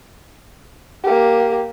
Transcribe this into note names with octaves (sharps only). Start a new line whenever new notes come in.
A#3 G4